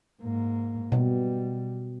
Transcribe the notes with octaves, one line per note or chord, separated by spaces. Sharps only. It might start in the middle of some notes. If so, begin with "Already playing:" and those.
G#2 A#3
B2 G3